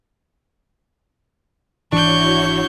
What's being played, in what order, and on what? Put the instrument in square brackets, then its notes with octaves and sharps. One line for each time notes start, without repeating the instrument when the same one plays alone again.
[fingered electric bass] G#1 E3 [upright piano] D4 [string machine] E4 F#4 C#5 [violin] C#6 G6